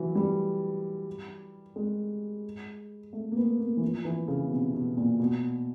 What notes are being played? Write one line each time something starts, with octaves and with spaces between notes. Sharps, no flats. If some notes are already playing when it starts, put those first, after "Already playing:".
Already playing: E3 F#3
G3
G#3
A3
A#3
B3
A#3
E3
F3
E3
C#3
B2
C3
B2
A#2
B2